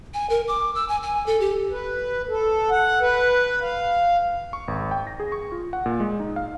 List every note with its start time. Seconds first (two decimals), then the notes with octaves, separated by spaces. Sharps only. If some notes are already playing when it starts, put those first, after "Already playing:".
0.14 G#5
0.30 A#4
0.48 D6
0.75 E6
0.88 G#5
1.03 G#5
1.26 A4
1.40 G4
1.71 B4
2.29 A4
2.71 F#5
3.01 B4
3.62 F5
4.53 C#6
4.68 G#1
4.91 G5
5.07 A#6
5.20 G#4
5.32 C#6
5.52 F4
5.73 F#5
5.86 A#2
6.00 G#3
6.20 D#4
6.36 F5